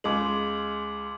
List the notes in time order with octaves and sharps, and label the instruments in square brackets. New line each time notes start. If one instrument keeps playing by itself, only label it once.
[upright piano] C#2 G#3 [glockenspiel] C6 D6 F#7